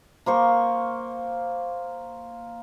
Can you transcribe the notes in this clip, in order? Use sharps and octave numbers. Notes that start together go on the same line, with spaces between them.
A#3 C5 C#6